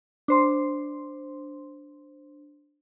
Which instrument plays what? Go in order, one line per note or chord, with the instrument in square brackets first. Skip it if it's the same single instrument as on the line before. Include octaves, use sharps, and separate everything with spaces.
[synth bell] D4 C5 C6